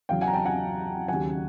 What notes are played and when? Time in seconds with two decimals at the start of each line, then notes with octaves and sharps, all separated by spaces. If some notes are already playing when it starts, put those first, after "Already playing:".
0.09 E2 C#3 F#3 F5 G5
0.21 F#5 G#5
0.28 A#5
0.33 G5 A5
0.46 F#5 G#5
1.08 D#2 C#3 F#3 F#5 G#5